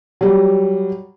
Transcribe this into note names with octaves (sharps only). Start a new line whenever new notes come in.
F#3 G3